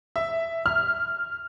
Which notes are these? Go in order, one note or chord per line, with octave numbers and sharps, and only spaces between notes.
E5
F6